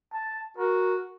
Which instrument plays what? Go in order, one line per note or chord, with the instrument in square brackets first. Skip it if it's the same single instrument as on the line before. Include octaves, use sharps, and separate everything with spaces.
[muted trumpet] A5
[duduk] F#4 [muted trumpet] A#4